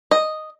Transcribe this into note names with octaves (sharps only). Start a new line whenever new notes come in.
D#5